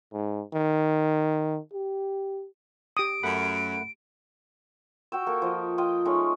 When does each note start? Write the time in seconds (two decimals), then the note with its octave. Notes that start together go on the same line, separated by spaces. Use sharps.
0.13 G#2
0.53 D#3
1.73 G4
2.97 G4 D#6 D7
3.23 F#2 A3 F#5 B5
5.12 F#4 G5 E6
5.27 A#3 A4
5.42 F3 D#5
5.78 F4 D#5 G5
6.05 G#3 A3 C#4 D#4